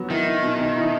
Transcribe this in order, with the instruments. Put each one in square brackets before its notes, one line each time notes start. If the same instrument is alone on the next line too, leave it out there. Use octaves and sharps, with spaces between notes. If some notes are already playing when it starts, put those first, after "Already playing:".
Already playing: [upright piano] F#3 B3
[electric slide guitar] D#3 [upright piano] E4
[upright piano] E4
B2
B2
E4